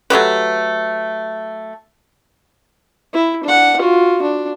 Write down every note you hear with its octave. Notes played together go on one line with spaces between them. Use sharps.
F#3 A3 G4 B4
E4
D4 F#5
F4 F#4
D4